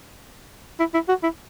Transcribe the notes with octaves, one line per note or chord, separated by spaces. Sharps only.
E4
E4
F#4
E4